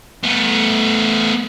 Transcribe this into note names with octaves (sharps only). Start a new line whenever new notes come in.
A3 B3